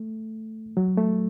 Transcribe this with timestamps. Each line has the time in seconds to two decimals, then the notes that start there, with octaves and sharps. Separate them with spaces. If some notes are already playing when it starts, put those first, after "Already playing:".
Already playing: A3
0.77 F#3
0.97 A3